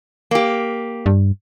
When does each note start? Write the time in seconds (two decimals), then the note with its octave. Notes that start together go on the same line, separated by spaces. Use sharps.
0.31 A#3 G4
1.06 G2